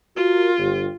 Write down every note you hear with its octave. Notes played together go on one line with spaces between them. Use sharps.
F4 F#4 A#4
G1 G4